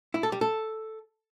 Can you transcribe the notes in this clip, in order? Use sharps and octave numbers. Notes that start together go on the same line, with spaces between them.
E4
A4
G3
A4